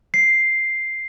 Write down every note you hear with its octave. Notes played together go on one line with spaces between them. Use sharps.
C7